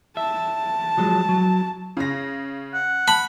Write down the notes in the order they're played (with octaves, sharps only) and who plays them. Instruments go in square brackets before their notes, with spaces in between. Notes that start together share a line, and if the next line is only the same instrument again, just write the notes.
[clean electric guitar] E5 [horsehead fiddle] A5
[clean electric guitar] F3 F#3 G#3
F#3
[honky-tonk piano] C#3 A#6
[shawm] F#5
[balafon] A5 [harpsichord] B5